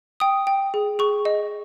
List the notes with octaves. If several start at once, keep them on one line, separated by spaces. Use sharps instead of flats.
G5 D#6
G5
G#4
G#4 C#6
D#5